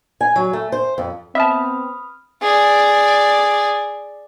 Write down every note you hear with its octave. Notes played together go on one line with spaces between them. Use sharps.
G#5
F#3
A3
C5
F2
B3 C4 E5 A5 B5 D#6 F6
G#4 D5